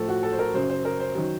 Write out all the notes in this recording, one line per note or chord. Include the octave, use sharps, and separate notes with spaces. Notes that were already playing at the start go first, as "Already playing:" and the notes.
Already playing: A2 F3 A4
F#4
A4
C5
A#4
F#2 C#3 F#3 C5
C5
A#4
C5
D#3 F#3